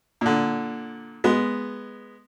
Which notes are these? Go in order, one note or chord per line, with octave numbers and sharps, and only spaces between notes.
A#2 D3
G#3 B3